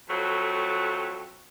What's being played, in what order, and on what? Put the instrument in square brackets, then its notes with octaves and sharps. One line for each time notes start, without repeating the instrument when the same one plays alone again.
[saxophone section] F2 F#3 A3